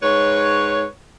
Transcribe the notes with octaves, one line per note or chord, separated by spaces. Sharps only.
G#2 B4 C#5